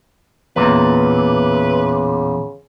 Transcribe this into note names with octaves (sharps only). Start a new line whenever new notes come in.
E2 A#2 C#3 B4